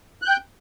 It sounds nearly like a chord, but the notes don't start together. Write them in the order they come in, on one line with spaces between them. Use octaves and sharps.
F#6 G6 G5